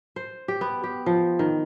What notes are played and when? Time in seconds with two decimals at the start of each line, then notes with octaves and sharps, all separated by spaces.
0.16 C5
0.48 G4
0.61 B3
0.84 G4
1.06 F3
1.39 D#3